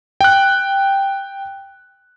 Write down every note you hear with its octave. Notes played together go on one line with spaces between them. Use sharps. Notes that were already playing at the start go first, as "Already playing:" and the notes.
G5 F#6